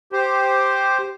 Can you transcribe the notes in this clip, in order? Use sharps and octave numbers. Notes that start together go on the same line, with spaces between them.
G4 C5